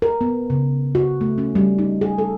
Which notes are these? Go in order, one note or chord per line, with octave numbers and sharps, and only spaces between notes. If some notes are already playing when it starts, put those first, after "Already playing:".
A#4
B3
C#3
F#4
A3
C#4
G3
D#4
G#4
A4